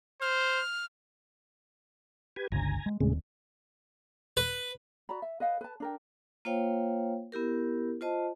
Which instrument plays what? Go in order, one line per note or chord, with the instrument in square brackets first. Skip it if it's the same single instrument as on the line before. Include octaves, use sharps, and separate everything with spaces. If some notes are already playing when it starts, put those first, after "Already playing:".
[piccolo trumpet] C5 [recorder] F6
[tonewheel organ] G4 B4 G#5
[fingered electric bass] G1 C#2 D3 [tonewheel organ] G#5 A#5
[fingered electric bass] G#3
[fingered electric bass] D#1 D#2 C4 [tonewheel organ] A2 C#3 G#3
[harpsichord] B4
[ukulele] F#4 D5 A#5 B5
E5
B4 D#5 F5 F#5
B4 A5
D4 A#4 G5
[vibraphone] A#3 F4 C5 C#5 F5 G5
B3 E4 G4 A#4
F4 C5 D#5 A5